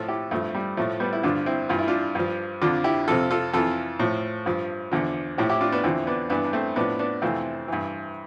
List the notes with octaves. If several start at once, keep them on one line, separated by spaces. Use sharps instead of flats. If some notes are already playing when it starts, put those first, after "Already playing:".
Already playing: A2 F3 F4 A4
E4 G4
G2 F3 A3
G3
A2 F3 A3
G3 B3
E4
G2 D3 F3 D4 F4
C4 E4
G2 E3 F4
E4
D4 F4
G2 F3
F2 D3 F3 D4 F4
E4 G4
F2 C3 F3 F4 A4
F4 A4
F2 E3 F4 A4
A2 F3
G2 F3
E2 D3 F3
A2 F3 E4 G4
E4 G4
D4 F4
B3 D4
E2 D3 F3 C4 E4
B3 D4
G2 E3 B3 D4
D4
A3 C4
A2 F3 B3 D4
B3 D4
F2 C3 E3 A3 C4
G2 E3